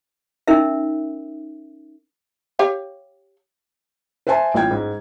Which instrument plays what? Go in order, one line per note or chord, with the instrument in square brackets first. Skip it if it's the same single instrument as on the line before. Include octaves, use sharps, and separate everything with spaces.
[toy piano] C#4 D#4 A#4 E5
[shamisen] G4 C#5 F5
[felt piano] B4 C5 E5 G#5 A5 C6
A1 F4 G5 G#6
G#2